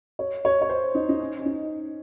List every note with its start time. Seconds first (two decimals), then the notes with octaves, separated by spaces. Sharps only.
0.19 C#5
0.45 C#5
0.62 C#5
0.70 C5
0.95 D#4
1.09 D#4
1.20 C#4
1.39 C#4
1.46 D#4